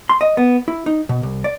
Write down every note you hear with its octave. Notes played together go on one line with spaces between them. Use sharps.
C6
D#5
B3
E4
D#4
B2
C2
D5